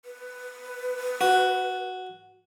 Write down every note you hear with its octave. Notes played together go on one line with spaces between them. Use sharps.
B4
F#4